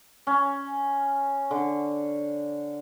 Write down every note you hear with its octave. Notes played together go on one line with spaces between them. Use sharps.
C#4
D3